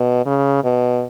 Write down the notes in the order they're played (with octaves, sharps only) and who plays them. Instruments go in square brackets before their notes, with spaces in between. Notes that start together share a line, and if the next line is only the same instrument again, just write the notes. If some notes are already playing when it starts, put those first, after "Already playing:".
Already playing: [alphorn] B2
C#3
B2